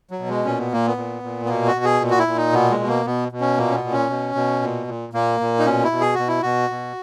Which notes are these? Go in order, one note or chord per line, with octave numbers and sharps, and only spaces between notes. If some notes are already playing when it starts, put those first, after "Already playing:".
F#3
B2
G#3
A#2 C#4
B3
A#2 A#3
B3
A#2
A#2
B3
B2 A#3
F#4
B2
G#4
A#2
F#4
E4
A#2
D#4
B2 B3
G#3
B2
A#3
B2 B3
B2
C#4
A#2 A#3
C#4
B3
A#2
C#4
B2
B2
A#2
A#2
A#2 A#3
A#2
D#4
B2 C#4
E4
B2
G#4
B2 F#4
E4
B2 F#4
B2